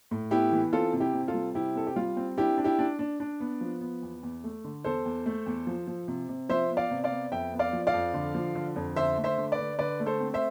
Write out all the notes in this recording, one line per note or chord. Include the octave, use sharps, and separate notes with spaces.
A2
B3 E4 G4
E3
C4 F4 A4
C3
E4 G4
C3
F4 A4
G3
C3 E4 G4
C4 A4
G4
G3 F4
C4
D4 E4 G4
D4
E4 G4
D4
D4
D4
B3
F3
B3
E2
E2
A3
D3
E2 A4 C5
E2
A3
E2
F3
F3
C3
C3
F3 C5 E5
B3
D5 F5
C3
D5 F5
B3
F2 E5 G5
B3
D5 F5
F3
D5 F5
F2
D3
F3
D3
F2
D3 C5 E5
A3
C5 E5
D3
B4 D5
D3
D3 B4 D5
A3
A4 C5
C4
C5 E5